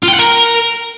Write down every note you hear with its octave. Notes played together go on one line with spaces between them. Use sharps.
F4
G5
F#5
A#4